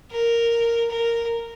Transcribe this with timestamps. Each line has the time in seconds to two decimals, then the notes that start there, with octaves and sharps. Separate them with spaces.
0.11 A#4
0.90 A#4